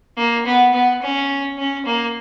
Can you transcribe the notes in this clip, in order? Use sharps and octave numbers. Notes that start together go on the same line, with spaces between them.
A#3
B3
B3
C#4
C#4
A#3